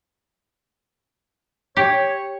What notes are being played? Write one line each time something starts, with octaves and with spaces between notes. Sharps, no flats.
G4 C#5